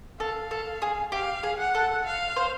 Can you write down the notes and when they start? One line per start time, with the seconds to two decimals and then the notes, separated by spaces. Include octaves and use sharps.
0.20 A4 F5
0.51 A4
0.82 G#4
1.12 G4 F5
1.43 G#4
1.59 F#5
1.75 A4
2.06 F5
2.36 C5